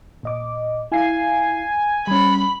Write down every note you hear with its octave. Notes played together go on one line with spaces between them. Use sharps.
A#2 D#5 D6
E4 F5 G#5 C7
G3 C#4 B5